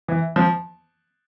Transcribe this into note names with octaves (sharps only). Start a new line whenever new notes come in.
E3
F3